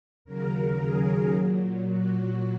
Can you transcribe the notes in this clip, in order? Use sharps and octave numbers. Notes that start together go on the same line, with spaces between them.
D#2 C#3 F#3 A#4
G#4
A#2 F#3
F#4